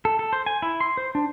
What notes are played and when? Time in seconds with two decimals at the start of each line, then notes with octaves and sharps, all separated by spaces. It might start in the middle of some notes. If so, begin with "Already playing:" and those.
0.05 A4
0.19 A4
0.33 C5
0.46 G#5
0.62 E4
0.80 C6
0.97 C5
1.15 D4